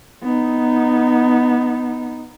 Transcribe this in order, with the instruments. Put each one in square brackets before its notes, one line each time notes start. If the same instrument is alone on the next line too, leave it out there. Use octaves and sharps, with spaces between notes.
[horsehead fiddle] B3 D#4